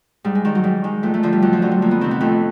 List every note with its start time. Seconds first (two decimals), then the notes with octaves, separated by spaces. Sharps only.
0.24 G#2 G3
0.35 G#3
0.45 D#3 G3
0.55 F#3
0.64 G#2 G3
0.84 D#3 G#3
1.03 F2 A3
1.14 A3
1.23 D3 F3
1.33 G3
1.42 F2 F#3
1.53 F3
1.62 D3 F#3
1.72 G3
1.82 F2 A#3
1.91 B3
2.01 C3 D#3 C4
2.11 B3
2.21 F2 A3